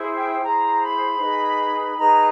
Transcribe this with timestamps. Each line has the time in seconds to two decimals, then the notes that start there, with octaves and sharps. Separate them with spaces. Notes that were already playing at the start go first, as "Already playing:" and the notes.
Already playing: E4 G#4 C5
0.16 G5
0.42 E4 G#4 C5 A#5
0.81 B5
1.19 D#4 G#4 B4
1.97 D#4 G#4 B4 A#5